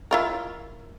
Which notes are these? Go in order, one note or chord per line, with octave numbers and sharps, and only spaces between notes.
E4 F4 A#4